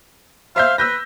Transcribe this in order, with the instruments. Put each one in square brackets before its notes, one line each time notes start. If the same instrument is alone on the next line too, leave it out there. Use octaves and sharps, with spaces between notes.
[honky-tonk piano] C5 E5 G6 [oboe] F5
[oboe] B4 [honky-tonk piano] E6 G6 A#6